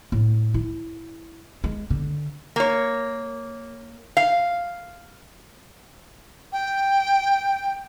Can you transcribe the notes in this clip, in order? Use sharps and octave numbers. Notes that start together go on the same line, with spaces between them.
A2
E4
G#3
D3
A#3 C#5
F5
G5